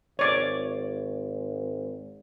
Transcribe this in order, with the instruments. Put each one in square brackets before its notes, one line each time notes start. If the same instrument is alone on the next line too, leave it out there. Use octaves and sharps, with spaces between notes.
[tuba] G#1 [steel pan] C#5 D5